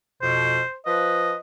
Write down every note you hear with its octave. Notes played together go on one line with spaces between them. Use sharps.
F2 B2 C5
F3 B4 D#5